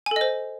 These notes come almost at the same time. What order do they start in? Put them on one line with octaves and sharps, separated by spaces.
G#5 A4 D#5 C5